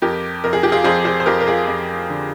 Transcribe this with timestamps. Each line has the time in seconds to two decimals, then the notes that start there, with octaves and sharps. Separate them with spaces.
0.02 F2 G4 A#4
0.44 F2 A#4
0.53 G#4
0.63 G4
0.72 F4 G#4
0.84 F2 G#4 C5
1.05 G#4 C5
1.20 C5
1.26 F2 G4 A#4
1.40 A#4
1.47 F4 G#4
1.67 F2
2.09 D3